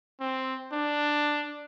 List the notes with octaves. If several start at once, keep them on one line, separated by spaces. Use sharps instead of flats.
C4
D4